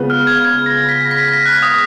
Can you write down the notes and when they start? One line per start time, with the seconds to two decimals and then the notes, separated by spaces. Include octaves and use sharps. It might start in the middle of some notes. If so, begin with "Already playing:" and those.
Already playing: C#3 G#3 B3 F4 B4
0.10 F6
0.27 G#6
0.45 G#6
0.66 A#6
0.89 B6
1.01 A#6
1.11 B6
1.29 A#6
1.46 F#6
1.62 D#6